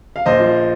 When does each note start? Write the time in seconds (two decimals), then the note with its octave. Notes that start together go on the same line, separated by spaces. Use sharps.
0.16 F5
0.26 A#1 C5 D#5
0.40 F3